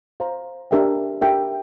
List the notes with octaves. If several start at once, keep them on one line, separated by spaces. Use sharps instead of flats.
C5 F5 A#5
D4 G4 A#4 E5 G5
D4 G4 A#4 E5 G5